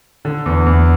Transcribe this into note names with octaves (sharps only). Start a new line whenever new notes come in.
D3
E2
E2